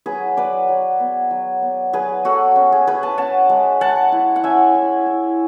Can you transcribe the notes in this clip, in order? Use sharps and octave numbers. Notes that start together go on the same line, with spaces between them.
F#3 G#4 B4
F#3 B4 D5
F#3
B3
F#3
B3
F#3 G#4 B4
F#3 F#4 A4
C#4
G#4
C#4 G#4 B4
A5
C#4 F#5 A5
G#3
G#3 F#5 A5
E4
F#5
C#4 E5 G#5
E4
E4